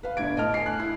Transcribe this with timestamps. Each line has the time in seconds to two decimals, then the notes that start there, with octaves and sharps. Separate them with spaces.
0.03 B4 F5
0.17 G1 G2 D4 G#6 D7
0.36 A2 D#5 A5 F6
0.54 G#5 C7
0.66 F#6
0.79 E4